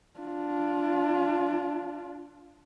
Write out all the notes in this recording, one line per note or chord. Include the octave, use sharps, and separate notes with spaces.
D4 F4